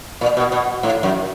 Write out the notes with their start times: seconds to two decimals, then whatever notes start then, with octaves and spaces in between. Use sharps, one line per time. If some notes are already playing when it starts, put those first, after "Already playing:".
0.21 A#2
0.37 B2
0.52 B2
0.83 A2
1.03 F#2